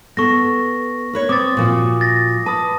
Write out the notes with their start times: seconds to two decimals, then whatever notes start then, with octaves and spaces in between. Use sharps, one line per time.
0.17 B3 A4 C#6 A#6
1.13 A#4 B4 C#5
1.29 C4 D6 D#6 A6
1.57 A#2 F3 F#4
2.01 A6 A#6
2.46 B4 A5 D#6